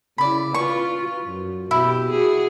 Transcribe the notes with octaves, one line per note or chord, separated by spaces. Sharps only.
C#3 E4 D5 B5
F4 B4 C#6
F#2
B2 E4 G4
F#4 G#4